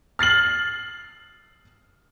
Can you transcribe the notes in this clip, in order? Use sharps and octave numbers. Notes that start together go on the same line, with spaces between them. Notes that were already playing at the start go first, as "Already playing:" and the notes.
F6 A6 C7 F#7